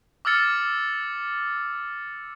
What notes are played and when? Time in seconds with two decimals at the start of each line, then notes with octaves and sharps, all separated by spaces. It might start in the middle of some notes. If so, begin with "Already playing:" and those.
0.25 D6 E6 F6 A6 C#7